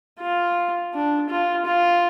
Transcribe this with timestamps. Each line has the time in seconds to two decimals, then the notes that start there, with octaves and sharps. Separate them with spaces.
0.20 F4
0.93 D4
1.29 F4
1.65 F4